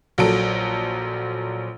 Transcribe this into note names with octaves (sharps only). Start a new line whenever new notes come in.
A#1 F#3 A4 D7